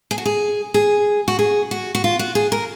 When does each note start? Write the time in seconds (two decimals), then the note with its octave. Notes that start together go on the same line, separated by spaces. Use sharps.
0.11 G#4
0.18 F#4
0.26 G#4
0.74 G#4
1.28 F#4
1.39 G#4
1.71 F#4
1.95 F#4
2.04 F4
2.19 F#4
2.35 G#4
2.52 A#4